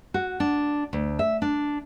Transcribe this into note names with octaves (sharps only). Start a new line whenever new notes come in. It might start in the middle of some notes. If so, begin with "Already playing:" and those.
F#4
D4
D2
E5
D4